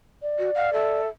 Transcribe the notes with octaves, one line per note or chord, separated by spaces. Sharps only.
D5
F#4
F5 F#5
A4 E5